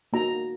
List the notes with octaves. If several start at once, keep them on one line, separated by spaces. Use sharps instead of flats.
A#3 D#4 F#4 A#5